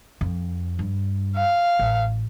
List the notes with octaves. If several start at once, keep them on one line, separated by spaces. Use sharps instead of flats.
F2
G2
F5
A1